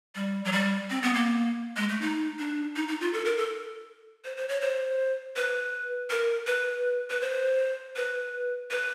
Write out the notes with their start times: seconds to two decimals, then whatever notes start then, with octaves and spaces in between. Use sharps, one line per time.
0.15 G3
0.45 F#3
0.52 G3
0.90 C4
1.03 B3
1.14 A#3
1.77 G#3
1.89 A3
2.01 D#4
2.39 D4
2.76 D#4
2.88 D#4
3.01 F4
3.13 A4
3.25 A#4
3.38 A4
4.25 C5
4.37 C5
4.49 C#5
4.61 C5
5.36 B4
6.10 A#4
6.47 B4
7.10 B4
7.21 C5
7.96 B4
8.71 B4